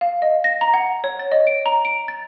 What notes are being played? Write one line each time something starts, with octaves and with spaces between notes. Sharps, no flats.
F5
D#5
A#6
A#5
F#5
C#5
A6
D#5
D7
A#5
D7
A6